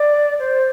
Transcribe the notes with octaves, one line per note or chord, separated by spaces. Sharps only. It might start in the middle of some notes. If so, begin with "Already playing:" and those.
Already playing: D5
C5